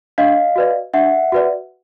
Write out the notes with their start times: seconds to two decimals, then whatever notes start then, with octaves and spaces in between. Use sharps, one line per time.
0.18 D4 D#5 F5
0.56 F#4 B4 D5
0.93 D4 E5 F#5
1.32 F#4 B4 D5